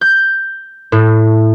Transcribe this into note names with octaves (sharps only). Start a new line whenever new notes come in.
G6
A2